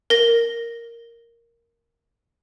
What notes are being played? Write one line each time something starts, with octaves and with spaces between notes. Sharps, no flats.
A#4 A#6